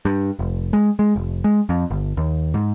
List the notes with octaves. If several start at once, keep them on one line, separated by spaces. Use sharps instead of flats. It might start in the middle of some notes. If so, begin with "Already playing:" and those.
G2
F1
G#3
G#3
F1
G#3
F2
G1
D#2
G#2